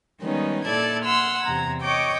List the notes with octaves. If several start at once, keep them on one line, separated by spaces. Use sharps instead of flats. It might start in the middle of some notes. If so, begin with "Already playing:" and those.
D#3 G3 G#3 B3 C#4 D#4
A#2 E4 A4 D5 A5 G#6
F#5 C6 E6 F6
E2 C3 A#5 G#6
C#5 D#5 G5 C#6 D6